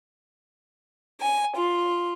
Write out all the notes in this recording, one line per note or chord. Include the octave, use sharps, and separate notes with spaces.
G#5
F4